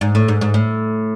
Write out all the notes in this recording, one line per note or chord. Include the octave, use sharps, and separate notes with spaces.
G#2
A2
G#2
G#2
A2